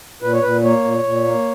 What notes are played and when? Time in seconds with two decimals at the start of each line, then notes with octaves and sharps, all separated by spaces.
0.22 A#2 B4
0.33 C#5
0.42 A#2 B4
0.64 A#3 C#5
0.84 A#2
1.04 A#2
1.25 A#3